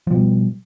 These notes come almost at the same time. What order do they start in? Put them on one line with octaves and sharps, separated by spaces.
F3 B2 G3